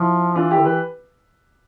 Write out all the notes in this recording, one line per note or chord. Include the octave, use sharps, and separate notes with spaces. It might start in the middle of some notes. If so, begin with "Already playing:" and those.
Already playing: F3 E4
E3 D4 F4
E4 G4
D3
E3 G4 B4